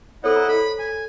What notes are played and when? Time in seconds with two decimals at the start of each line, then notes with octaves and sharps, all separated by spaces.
0.24 E4 A4 C5 C#5 D#5 F#5
0.36 A#5
0.49 A4 B5
0.79 G#5